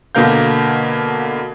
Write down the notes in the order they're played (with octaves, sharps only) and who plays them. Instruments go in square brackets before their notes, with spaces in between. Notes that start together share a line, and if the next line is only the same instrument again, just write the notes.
[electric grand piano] B2 D3 A#3 A#4 F5 G6